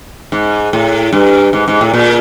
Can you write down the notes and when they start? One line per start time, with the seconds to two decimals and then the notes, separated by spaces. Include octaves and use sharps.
0.32 G#2
0.73 A2
1.13 G2
1.53 G#2
1.68 G#2
1.81 A2
1.94 A#2